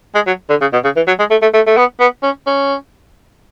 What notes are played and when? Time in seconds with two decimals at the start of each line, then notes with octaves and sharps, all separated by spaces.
0.15 G#3
0.27 F#3
0.50 D3
0.61 C#3
0.73 B2
0.84 C#3
0.96 E3
1.07 F#3
1.19 G#3
1.30 A3
1.42 A3
1.54 A3
1.67 A3
1.77 B3
2.00 B3
2.23 C#4
2.46 C#4